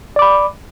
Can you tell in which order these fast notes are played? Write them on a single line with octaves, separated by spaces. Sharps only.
D5 D6 B5